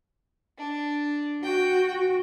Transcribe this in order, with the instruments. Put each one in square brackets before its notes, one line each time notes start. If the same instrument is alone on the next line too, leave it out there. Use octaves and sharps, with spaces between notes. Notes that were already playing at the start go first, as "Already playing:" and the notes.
[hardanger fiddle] D4
[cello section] F#4 [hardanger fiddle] G5